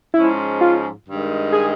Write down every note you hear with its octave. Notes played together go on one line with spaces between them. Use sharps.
G#2 F3 G#3 C#4 E4
F4
G2 D#3 G#3
G#4